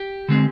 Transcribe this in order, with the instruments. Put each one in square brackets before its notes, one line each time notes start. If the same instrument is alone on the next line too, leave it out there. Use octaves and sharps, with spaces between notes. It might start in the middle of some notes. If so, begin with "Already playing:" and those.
Already playing: [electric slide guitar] G4
D3 G#3 C4